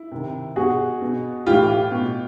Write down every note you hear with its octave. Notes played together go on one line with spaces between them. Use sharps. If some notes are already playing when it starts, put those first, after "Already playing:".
Already playing: E4
C3 D#3
B2 F#4 G#4
B2
A2 E3 F4 G4
B2